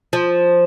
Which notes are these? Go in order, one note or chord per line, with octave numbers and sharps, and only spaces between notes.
F3